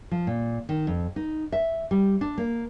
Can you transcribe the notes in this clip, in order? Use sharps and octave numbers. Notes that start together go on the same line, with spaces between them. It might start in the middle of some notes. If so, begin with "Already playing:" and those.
F3
A#2
D#3
F2
D#4
E5
G3
D4
A#3